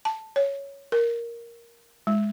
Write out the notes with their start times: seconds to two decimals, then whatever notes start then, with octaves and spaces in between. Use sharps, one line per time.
0.05 A5
0.36 C#5
0.92 A#4
2.07 G#3